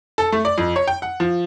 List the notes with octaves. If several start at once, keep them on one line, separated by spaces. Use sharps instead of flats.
A4
A3
D5
F2
C#5
G5
F#5
F3